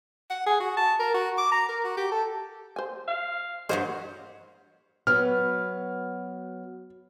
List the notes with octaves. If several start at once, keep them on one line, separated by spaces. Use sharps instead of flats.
F#5
G#4
F#4
A5
A#4
F#4
D6
A#5
A#4
F#4
G4
A4
C5 G#5
F5
G2 A#3 F#4 A#4 C5 C#5 D#5
F#3 B3 F6